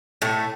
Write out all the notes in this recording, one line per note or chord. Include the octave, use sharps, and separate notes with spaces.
A2 A3